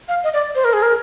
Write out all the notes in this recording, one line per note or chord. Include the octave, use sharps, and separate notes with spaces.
F5
D#5
D5
C5
A#4
G#4
A#4